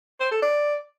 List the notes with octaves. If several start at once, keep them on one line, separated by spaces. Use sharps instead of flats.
C5
A4
D5